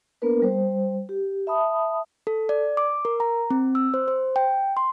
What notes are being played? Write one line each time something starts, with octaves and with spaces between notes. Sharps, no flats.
A#3 B3 D4 A#4 B4
G3 C5
G4
E5 A5 B5 D#6
A4
D5
D6
A#4
A#5
C4
E6
C5
C5
G5
C6